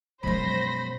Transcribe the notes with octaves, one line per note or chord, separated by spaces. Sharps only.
F#2 B2 F3 G#3 C5 B5 A#6